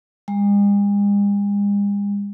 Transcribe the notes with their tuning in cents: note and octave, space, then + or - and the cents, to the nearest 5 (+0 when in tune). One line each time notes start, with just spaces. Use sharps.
G#3 -45